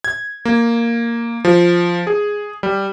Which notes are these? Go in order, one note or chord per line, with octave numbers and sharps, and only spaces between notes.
G#6
A#3
F3
G#4
G3